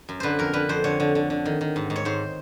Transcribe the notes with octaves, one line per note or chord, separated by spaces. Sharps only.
F#2
D3 B4 C5
F2 A#4
D3 B4
F2 C5
D3 C#5
D3
D3
D3
D#3
D#3
G#2
G#2
C#5
G#2 C5